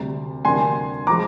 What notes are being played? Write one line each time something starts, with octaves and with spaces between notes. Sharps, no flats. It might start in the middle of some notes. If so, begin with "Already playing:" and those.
Already playing: D2 C3 G3
D2 C3 G3 A#3 D4 G#5 C6
F3 G#3 A#5 D6